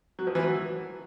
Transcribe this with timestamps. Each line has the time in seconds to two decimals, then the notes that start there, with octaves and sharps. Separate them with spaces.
0.19 F#3
0.27 F3
0.35 E3
0.43 F#3